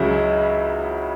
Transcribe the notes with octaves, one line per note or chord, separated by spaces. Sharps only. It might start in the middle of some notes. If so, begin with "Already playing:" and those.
Already playing: C#2 C#3 F#3 E4